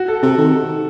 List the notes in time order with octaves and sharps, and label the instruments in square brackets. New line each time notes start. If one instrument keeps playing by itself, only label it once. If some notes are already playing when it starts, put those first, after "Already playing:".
Already playing: [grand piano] F#4
A4
[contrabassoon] C3 [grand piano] A4
[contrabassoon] D#3